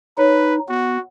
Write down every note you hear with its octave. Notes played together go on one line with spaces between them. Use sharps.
D#4 B4 C#5
B3 F#4